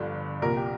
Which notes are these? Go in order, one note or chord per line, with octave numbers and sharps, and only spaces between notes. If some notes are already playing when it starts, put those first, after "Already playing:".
Already playing: G1 G2 D3 F3
C2 A#2 F3 A#4
G4